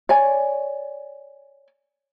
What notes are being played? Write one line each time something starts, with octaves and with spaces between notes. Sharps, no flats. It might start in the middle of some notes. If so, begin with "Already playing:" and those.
C#5 D5 G#5